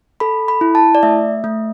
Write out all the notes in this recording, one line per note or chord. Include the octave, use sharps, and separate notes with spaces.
A4 B5
B5
E4
A5
D5
A3 E5
A3